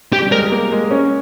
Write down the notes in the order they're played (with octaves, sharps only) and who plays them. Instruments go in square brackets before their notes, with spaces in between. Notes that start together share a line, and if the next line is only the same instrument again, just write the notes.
[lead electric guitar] G4
[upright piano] G3
[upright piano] G#3 [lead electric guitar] A#4
[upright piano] A#3
G#3
C#4